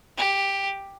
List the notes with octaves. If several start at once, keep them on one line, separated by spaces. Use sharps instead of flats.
G4